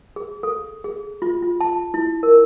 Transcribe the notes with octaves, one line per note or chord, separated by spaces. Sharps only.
G#4
A4
G#4
F4
F4
A5
E4
A#4